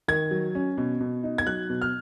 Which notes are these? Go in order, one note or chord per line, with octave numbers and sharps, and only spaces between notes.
D#3 G#6
F#3
C#4
B2
B2
D#4
G#6
F#3 F#6
B2
F6